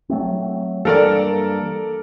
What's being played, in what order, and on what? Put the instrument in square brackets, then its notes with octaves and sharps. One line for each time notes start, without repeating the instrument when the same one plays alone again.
[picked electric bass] F#3 A3 C4
[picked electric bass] G2 E3 A#3 [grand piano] A4 A#4 D5